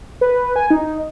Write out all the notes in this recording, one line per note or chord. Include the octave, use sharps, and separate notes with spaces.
B4
G#5
D#4